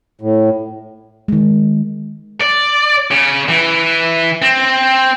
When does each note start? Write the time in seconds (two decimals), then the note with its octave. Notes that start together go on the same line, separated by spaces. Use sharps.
0.21 A2
1.28 D#3 G#3
2.41 D5
3.11 C#3
3.48 E3
4.42 C4